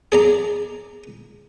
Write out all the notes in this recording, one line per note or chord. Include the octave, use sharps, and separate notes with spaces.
G#4 D5 A#5